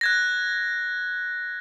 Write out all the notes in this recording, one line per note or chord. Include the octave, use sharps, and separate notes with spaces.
F#6 G#6 A#6